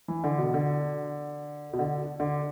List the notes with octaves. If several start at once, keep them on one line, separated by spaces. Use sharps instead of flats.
E3
D3
B2
D3
B2
D3
D3